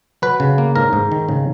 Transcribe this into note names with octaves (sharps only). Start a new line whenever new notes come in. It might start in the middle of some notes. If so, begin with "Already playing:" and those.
F#3 B4
C#3
A#3
G#2 A#4
G#2
D#3
C#3